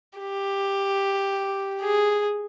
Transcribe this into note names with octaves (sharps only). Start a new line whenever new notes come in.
G4
G#4